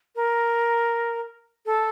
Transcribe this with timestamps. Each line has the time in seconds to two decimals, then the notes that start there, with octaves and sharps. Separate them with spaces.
0.16 A#4
1.66 A4